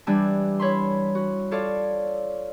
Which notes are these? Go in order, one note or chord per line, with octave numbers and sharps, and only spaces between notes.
E3 G3 D4 G#5 E6
E4 C#5 B5 C6
F#4
F4 A4 C#5 D5 F5